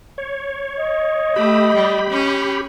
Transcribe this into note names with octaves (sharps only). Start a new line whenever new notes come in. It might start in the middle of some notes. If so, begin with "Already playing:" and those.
C#5
D#5
A3 G4 B5
G3
C#4